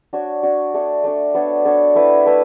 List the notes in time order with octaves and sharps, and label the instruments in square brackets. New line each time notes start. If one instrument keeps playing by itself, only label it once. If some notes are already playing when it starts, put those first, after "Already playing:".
[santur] D4 F#4 C#5
D4 F#4 C#5
A3 D4 A4
A3 D4 A4
B3 D4 A4 C#5
B3 D4 A4 C#5
A3 E4 B4 E5
A3 E4 B4 E5